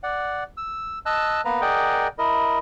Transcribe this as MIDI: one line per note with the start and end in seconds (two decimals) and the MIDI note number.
0.03 0.44 74
0.03 0.44 78
0.57 0.99 88
1.06 1.41 75
1.06 1.41 81
1.06 1.41 88
1.06 1.41 90
1.45 1.61 58
1.45 1.61 59
1.45 1.61 71
1.45 1.61 82
1.61 2.08 68
1.61 2.08 70
1.61 2.08 74
1.61 2.08 75
1.61 2.08 78
1.61 2.08 79
2.18 2.59 64
2.18 2.59 70
2.18 2.59 75